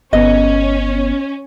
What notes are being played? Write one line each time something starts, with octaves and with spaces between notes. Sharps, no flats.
G1 B3 C#4 D#5